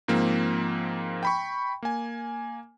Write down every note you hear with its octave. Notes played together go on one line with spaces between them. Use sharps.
G#2 F3 A#3 C4
G5 B5 C#6
A#3 G#5